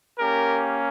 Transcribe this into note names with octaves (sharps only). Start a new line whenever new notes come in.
A#3 C#4 G4 A#4